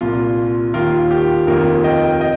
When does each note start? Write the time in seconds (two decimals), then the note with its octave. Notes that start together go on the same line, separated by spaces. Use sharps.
0.01 C2 A#2 F4
0.74 D#2 D#3 F4 A#4
1.11 G4
1.47 F1 D#2 D#3 F4 A#4
1.84 D#5 G5
2.21 D#5 G5